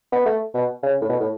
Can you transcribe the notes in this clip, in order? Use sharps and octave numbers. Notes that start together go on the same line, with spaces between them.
B3
A3
B2
C#3
A2
B2
A2